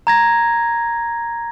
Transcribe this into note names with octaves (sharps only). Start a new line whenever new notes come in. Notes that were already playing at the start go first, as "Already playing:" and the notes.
A#5 G#6 A#6